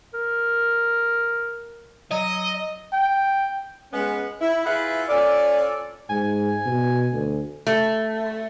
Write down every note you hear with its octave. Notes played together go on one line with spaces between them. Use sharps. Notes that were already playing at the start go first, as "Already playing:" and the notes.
A#4
F#3 D#5
G5
G#3 B3 C#4
E4
E4 F4 G#4 B4 E5 F#5
C#4 F4 A4 D5
G#2 G#5
B2
D2
A3